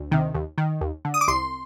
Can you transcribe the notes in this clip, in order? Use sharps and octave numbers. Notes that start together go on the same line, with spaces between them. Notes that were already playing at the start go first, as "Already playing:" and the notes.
Already playing: D2
C3 D#3
D#2
D#3
D#2
D3
D#6
D6
C2 C6